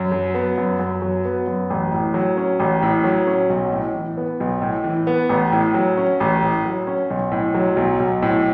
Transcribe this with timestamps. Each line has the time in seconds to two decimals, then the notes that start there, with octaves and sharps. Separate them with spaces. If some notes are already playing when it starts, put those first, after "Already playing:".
Already playing: F#2
0.12 F#3
0.34 B3
0.58 F#2
0.80 F#2
1.02 F#3
1.25 B3
1.47 F#2
1.70 A1
1.92 A2
2.14 F#3
2.37 C#4
2.60 A1
2.82 A2
3.04 F#3
3.27 C#4
3.50 B1
3.73 A2
3.95 E3
4.17 B3
4.40 B1
4.62 A2
4.84 E3
5.07 B3
5.29 A1
5.52 A2
5.74 F#3
5.97 C#4
6.20 A1
6.43 A2
6.65 F#3
6.87 C#4
7.10 B1
7.32 A2
7.54 F#3
7.77 B1
8.00 B1
8.22 A2